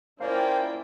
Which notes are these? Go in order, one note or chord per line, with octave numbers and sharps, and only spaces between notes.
A#3 C#4 E4 F4 C5 D5 F5 G5